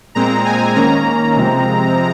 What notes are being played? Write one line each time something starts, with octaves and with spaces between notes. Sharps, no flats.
A#2 G#3 C4 A#5
G#5
D#3 A#3 C#4 A#5
C3 F3 G#3 C4